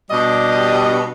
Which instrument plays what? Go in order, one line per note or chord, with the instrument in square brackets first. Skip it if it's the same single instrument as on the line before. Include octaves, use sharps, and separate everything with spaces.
[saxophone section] B2 G3 D4 G4 D#5